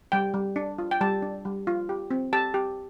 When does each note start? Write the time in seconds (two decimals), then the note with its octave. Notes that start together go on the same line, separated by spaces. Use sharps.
0.12 G3 G5
0.34 G3
0.56 D4
0.78 F4
0.91 G5
1.01 G3 A5
1.22 D4
1.45 G3
1.67 F4
1.89 G4
2.11 C4
2.33 G4 A5
2.54 G4